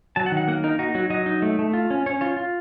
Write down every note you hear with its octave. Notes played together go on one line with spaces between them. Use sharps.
F#3 A5
F#5
D#3
F#5
A#3 F#5
D#4 A#4
D#4 F#4
F#3 F#4
F#3 D#5
D#4
A3
A3
F4
C#4
C#4 C#5
F4 C#5
F4